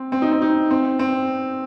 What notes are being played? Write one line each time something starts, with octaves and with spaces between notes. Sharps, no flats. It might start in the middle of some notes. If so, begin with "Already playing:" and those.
Already playing: C4
C4
D#4
C4
D#4
C4
C4